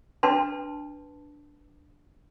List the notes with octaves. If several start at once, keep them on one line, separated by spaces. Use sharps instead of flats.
D4 B4 A5 C6